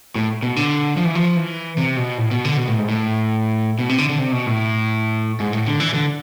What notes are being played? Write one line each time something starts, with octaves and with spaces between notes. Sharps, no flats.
A2
B2
D3
F3
E3
F3
E3
C3
B2
A2
B2
D3
B2
A2
G#2
A2
B2
C3
D3
D3
C3
B2
A2
G#2
A2
D3
E3
D3